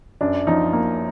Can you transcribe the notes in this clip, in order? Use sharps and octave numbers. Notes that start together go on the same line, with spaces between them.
F#2 D4
F3 D#4
A#3